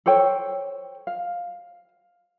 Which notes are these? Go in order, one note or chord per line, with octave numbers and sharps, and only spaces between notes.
A4 C5 C#5 G5
F5